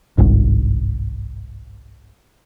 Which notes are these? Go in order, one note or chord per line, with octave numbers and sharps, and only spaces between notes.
G1 C2 G#2